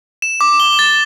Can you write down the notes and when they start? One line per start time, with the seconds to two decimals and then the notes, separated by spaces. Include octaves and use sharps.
0.22 E7
0.41 D6
0.60 G7
0.79 A6